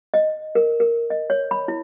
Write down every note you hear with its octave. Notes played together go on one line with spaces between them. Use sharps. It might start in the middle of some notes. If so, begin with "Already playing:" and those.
D#5
A#4
A#4
D#5
C#5
B5
E4